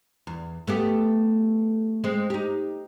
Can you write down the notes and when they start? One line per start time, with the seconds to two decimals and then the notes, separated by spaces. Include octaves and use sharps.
0.27 E2
0.67 A3 B3 G4
2.04 G#3 C4
2.30 D#4 G4